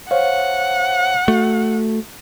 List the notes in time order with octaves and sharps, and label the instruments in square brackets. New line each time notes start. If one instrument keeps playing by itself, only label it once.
[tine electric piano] C5 C#5 F5 [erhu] F#5
[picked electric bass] A3 [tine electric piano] F#4